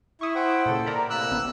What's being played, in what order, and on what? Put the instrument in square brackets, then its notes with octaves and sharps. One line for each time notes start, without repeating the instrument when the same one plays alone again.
[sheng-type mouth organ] E4 [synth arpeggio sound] C#6 D#6
[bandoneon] C5 F#5 G5
[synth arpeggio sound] A#2 C#3 [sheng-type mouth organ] A4
[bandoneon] A#4 [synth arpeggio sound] D5 A#5 B5
[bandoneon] A2 C3 A#3 [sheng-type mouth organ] E6 F#6
[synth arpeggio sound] A1 B3